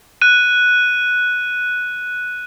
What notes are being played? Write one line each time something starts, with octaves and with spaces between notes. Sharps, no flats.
F#6 D#7